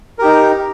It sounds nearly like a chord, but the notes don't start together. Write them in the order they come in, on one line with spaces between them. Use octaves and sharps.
A#4 G4 D#4